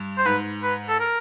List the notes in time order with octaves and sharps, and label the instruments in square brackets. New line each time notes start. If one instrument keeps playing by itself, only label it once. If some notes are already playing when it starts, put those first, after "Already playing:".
Already playing: [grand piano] G2
[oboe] C5
[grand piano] G#2 [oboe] B4
[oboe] B4
A4
A#4